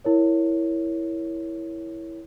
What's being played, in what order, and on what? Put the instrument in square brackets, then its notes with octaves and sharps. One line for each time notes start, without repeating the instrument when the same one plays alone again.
[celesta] E4 A#4 C#5